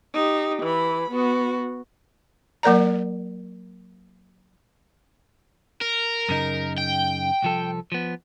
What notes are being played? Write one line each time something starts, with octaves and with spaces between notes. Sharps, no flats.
D#4 G4
E3 B5
B3 F#4
F#3 A#3 A#4 D5 A#5
A#4
F#2 C#3 D#4
G5
C2 F3 A4
F3 B3